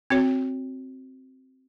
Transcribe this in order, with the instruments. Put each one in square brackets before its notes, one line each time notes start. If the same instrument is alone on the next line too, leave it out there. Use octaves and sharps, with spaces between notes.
[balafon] C4 F#4 C#5